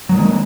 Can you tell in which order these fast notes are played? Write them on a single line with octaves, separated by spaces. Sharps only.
F#3 D#3 G#3 A#3